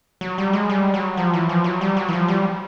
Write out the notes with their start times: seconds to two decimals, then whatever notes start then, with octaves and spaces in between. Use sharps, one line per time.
0.21 F#3
0.38 G3
0.53 G#3
0.70 G3
0.94 F#3
1.17 F3
1.34 E3
1.49 F3
1.64 F#3
1.81 G3
1.97 F#3
2.08 E3
2.13 F3
2.28 G3